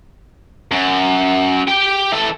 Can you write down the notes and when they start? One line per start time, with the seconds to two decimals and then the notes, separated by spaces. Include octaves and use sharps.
0.71 F#2
1.68 G4 G5
2.12 E3 A4